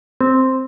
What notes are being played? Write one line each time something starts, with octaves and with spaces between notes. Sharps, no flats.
C4